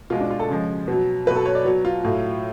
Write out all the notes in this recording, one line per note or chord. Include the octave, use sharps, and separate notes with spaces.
B2 G#3 F4
D4
F4
A4
C#3 F3 G#3
B2 F#3
B2 F#3 B4
A4
C#5
D5
B2 F#3
F4
A2 F#3